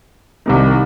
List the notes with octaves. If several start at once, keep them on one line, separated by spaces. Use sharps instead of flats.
C2 C3 D#3